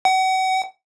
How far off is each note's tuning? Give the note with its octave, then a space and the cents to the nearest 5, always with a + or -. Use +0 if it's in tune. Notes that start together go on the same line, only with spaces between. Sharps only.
F#5 +35